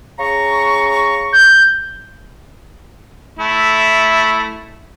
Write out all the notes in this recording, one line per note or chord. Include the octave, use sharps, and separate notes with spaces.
C#3 A#5 C#6
G6
A3 E4